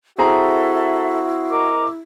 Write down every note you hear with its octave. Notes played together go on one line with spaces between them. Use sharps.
C4 E4 F#4 G#4 A4 E5 A#5
A#4 D#5 D6